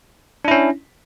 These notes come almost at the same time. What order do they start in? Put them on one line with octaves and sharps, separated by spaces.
D4 E4 C#4